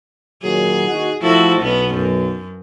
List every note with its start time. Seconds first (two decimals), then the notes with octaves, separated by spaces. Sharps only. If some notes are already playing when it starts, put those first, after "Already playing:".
0.43 A#2 D#3 F#3 G#4
0.86 D#2 D#4 F#4
1.21 F3 A3 E4 F#4 A4
1.59 B1 B3 C#4
1.94 F#2